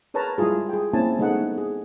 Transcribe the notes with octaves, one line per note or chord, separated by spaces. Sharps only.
G#4 A#4 B4 C#5 A5 A#5
G3 G#3 E4 F4 G#4
G#4 G5
A#3 C4 C#4 E4 G#5 A5
G3 A3 B3 D#4 G#4 F#5
G#4